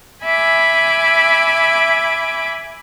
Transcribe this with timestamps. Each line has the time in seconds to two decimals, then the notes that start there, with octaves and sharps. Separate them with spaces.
0.25 E5 G#5 B5 D6